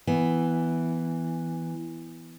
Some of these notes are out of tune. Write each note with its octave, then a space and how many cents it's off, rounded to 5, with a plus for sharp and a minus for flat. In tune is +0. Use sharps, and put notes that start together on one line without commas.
E3 +0 B3 +5